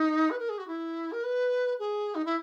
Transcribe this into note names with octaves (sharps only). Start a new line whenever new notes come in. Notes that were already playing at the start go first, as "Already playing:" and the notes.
Already playing: D#4
B4
A#4
G#4
F#4
E4
A#4
B4
G#4
D#4
E4